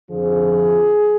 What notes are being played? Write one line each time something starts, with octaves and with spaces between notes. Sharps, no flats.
F2 D3 F3 G#4